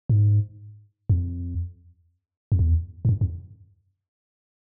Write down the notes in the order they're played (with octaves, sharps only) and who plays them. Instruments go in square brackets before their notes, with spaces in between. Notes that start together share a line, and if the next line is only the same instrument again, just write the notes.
[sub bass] G#2
F2
F2
E2
G2
F#2
F2